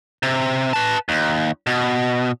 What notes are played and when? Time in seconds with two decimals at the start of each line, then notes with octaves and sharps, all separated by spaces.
0.23 C3
0.73 B4 A5
1.09 D#2
1.67 B2